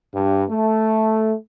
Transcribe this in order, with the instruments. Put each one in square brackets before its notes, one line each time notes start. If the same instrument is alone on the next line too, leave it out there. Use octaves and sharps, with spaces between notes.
[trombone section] G2
A3